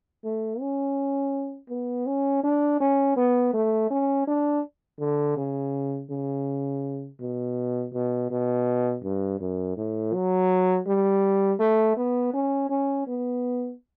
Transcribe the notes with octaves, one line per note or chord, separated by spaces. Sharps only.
A3
C#4
B3
C#4
D4
C#4
B3
A3
C#4
D4
D3
C#3
C#3
B2
B2
B2
G2
F#2
A2
F#3
G3
A3
B3
C#4
C#4
B3